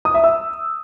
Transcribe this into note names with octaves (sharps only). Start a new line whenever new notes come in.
D#6
E5
E6